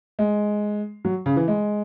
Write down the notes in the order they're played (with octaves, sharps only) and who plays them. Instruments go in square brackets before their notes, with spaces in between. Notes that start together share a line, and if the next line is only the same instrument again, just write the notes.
[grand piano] G#3
F#3
C#3
E3
G#3